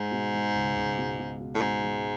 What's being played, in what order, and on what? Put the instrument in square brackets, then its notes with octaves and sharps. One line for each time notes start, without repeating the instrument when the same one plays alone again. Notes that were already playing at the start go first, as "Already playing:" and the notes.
Already playing: [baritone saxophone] G#2 [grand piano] G#3
[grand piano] B2
G#3
C#2
C#2
B2
B2
B2
[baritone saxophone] A2
[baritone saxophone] G#2 [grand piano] B2
[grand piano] G#3